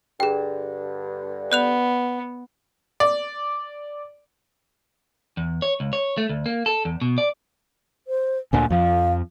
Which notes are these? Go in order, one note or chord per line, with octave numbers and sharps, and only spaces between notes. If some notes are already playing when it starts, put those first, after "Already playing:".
G2 D3 G#4 G5
B3 D5 F#6 F7
D5
E2
C#5
C#2
C#5
A3
D2
A#3
A4
E2
B2
D5
C5
D2 A#2 D3 G#5
F2 F3 F5